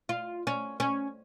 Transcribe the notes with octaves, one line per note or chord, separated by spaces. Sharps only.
F4
C#4
C#4